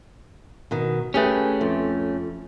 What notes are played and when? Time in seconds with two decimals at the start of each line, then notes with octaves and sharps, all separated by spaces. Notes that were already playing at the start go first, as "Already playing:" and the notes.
0.71 B2 D#3
1.14 A3 C#4 G4 G#4 B4
1.61 F2